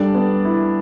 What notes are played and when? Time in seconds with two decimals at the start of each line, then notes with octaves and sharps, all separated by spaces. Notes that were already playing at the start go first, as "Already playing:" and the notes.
Already playing: G3 D4 A4 D5
0.14 B3
0.45 E4